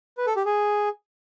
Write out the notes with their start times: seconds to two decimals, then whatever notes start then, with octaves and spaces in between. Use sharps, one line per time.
0.18 B4
0.27 A4
0.36 G4
0.46 G#4